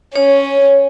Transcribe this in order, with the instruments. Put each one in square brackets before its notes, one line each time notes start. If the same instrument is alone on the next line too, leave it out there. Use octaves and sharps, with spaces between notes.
[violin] C#4 [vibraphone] C#5